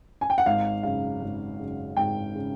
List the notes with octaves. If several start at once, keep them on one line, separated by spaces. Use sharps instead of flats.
G#5
G5
F#5
G#1 F5
F#2 C#3 F5
G#1
F#2 C#3
G#1 G5
C#3